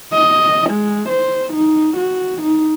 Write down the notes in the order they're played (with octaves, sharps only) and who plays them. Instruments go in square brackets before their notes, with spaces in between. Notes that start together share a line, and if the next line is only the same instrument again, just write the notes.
[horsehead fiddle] D#5
G#3
C5
D#4
F#4
D#4